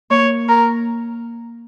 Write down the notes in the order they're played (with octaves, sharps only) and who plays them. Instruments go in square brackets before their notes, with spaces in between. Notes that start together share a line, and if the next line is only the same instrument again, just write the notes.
[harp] A#3 [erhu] C#5
[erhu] A#4